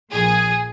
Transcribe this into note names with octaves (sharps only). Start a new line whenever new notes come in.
A#1 A#2 F3 G#4